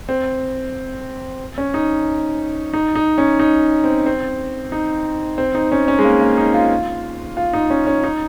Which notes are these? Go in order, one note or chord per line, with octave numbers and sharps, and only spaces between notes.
C4
C#4
D#4
D#4
D#4
C#4
D#4
C4
C4
D#4
C4
D#4
C#4
C#4
G#3
A#3
A#3
D#4
F4
F4
D#4
C#4
C#4
D#4